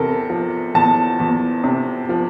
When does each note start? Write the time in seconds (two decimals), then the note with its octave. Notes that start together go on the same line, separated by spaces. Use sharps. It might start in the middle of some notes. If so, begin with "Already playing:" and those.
Already playing: E2 C3 A4 A#4
0.30 F3
0.75 E2 A5
1.20 E2
1.64 C3
2.09 F3